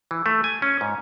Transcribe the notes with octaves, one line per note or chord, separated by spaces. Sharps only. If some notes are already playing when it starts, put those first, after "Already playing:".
E3
A3
G#5
C#4
G#2